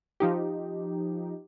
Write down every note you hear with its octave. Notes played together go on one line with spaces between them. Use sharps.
F3 D#4 G4